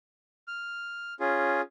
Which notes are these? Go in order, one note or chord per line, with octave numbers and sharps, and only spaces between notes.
F6
C#4 F4 G#4